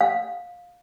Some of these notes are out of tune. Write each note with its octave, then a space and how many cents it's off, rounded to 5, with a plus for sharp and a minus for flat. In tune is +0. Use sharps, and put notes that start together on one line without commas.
F5 +15